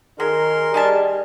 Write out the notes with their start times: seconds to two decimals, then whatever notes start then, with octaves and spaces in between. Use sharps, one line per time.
0.20 D#3 F#3 G#4 A#4 C6
0.74 G3 D#4 G#5 A5